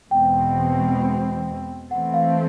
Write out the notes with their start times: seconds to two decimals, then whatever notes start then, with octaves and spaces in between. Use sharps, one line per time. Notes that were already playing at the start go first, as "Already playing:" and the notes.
0.11 E2 B2 G#3 C4 G5
1.91 E3 A3 C4 F#5
2.14 F5